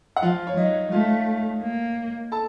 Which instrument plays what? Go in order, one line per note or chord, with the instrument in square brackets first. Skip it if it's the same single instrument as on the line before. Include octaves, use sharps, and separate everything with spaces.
[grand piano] F#5
[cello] F3 [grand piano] F4 F5
[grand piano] C#5
[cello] F#3 [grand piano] D#4 D#5
[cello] A3 [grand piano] F4 F5
[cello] A#3
[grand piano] A4 A5